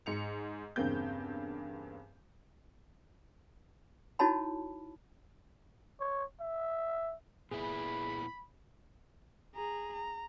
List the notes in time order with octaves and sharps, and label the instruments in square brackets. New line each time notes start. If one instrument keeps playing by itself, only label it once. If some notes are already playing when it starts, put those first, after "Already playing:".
[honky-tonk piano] G#2 C#7 F7
E2 G2 C#3 A#3 C4 G6
[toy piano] D#4 E4 F#4 C#5 A5 B5
[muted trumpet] C#5
E5
[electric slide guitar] A#2 B3 E4 [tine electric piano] G#4 [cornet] B5
[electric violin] G#4 A#5
A#5